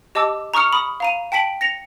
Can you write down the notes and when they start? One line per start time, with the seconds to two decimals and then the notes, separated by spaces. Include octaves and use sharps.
0.15 G4 D#5 A5 D6 E6
0.54 A#5 C#6 D#6 F6 C#7
0.73 B5 D#6
1.00 F5 A#5 D#7
1.32 G5 A5 B6 D7 F#7
1.61 A#6 C#7 F7